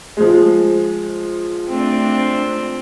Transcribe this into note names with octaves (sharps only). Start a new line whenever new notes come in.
F3 G#3
A3 C4 D4